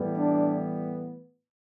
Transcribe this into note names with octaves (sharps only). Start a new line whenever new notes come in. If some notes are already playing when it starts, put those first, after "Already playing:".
Already playing: A2 E3 G3 B3
D4